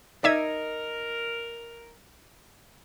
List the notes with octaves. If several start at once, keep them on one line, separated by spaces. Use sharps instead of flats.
D#4 A#4 D5 E5 G#6